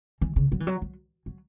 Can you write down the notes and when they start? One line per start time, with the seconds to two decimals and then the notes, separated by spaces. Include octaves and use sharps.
0.21 E3
0.36 C#3
0.52 F#3
0.60 E3
0.67 F#3
0.82 F#3
1.26 F#3